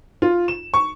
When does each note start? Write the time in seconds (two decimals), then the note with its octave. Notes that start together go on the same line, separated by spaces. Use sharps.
0.22 F4
0.48 E7
0.74 C#6